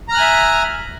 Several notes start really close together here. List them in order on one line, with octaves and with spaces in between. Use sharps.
A#5 F6 F#6 G#5 E5